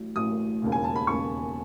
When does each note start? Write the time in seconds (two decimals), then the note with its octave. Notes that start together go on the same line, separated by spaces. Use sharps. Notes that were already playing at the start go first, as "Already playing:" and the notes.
Already playing: A1 A2 F#3
0.16 A1 A2 F#3 D#6
0.62 E1 D#2 C#3
0.72 G#5
0.84 A5
0.96 B5
1.07 E1 D#2 C#3 C#6